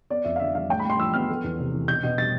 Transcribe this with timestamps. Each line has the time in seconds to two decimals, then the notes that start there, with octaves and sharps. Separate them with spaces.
0.10 B3 D5
0.25 F2 E5
0.36 F5
0.40 D3 E5
0.55 G3 F5
0.69 A2 G5
0.80 B5
0.84 A2
0.90 C6
1.00 F3 E6
1.14 B3 F6
1.29 A3
1.44 E2
1.59 C3
1.73 E3
1.88 B2 G6
2.03 B2
2.18 G3 A6